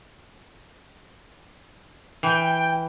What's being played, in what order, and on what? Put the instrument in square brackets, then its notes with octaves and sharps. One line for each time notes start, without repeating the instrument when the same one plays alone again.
[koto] E3 [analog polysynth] G5